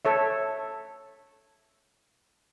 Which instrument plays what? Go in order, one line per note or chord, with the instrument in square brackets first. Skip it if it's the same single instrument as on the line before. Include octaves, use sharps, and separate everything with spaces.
[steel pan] A4 C#5 E5